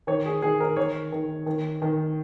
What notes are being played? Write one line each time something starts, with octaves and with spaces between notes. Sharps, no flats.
D#3 C#5
G#4
D#3 G#4
A#4
D#3 C#5
D#3
D#3
D#3